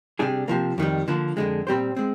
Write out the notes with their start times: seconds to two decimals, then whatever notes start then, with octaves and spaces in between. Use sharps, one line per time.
0.19 C3 G3 D4 G#4
0.48 C3 F3 A#3
0.78 F2 D#3 G3
1.08 D3 F3 A#3
1.37 F2 D3 G#3
1.67 A#2 G3 C4 G4 C5
1.97 G#3 C4